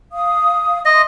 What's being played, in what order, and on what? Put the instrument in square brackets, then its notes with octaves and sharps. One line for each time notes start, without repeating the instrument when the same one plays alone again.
[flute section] F5 D#6
[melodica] D#5 [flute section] E5 C6